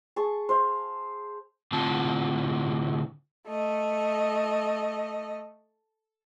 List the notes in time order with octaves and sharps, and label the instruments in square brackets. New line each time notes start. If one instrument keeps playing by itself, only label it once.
[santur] G#4 A5 C#6
C5 F5
[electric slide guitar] A2 D3 C4 F4 A5
[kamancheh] A3 D#5